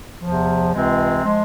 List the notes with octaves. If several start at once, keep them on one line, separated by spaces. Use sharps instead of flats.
E2 C3 F3
C#2 C3 E3 G#3 C4
F3 G#3